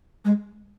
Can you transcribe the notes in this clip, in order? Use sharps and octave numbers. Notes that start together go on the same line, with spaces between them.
G#3